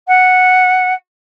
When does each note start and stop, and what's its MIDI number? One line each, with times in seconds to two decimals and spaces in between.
0.08 0.94 78